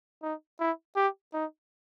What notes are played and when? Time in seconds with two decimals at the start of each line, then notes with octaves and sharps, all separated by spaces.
0.23 D#4
0.60 E4
0.96 G4
1.34 D#4